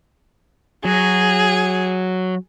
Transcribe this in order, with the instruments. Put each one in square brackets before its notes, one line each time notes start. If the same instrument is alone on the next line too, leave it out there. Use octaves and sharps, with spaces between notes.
[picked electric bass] F#3 [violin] G#4